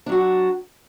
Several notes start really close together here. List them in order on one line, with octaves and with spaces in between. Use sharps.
D4 F#3 F#4